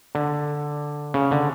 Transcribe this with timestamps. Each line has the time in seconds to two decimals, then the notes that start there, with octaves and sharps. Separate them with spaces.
0.15 D3
1.14 C#3
1.31 D3